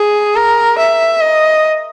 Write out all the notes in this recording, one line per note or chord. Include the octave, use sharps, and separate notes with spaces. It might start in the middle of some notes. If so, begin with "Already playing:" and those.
Already playing: G#4
A#4
E5
D#5